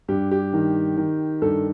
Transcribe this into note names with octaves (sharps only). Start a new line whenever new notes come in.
G2 G4
G4
D#3
D#3
G2 A4